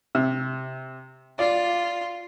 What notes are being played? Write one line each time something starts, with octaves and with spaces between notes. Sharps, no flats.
C3
F4 D5